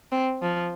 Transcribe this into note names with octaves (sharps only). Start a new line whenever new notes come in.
C4
F3